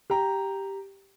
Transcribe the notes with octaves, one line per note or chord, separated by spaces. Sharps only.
G4 G5 A#5